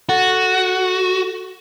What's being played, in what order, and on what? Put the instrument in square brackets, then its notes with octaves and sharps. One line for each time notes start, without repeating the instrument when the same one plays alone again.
[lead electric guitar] F#4 [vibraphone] A4